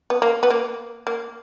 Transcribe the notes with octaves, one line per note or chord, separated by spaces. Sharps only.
B3
A#3
B3
A#3
A#3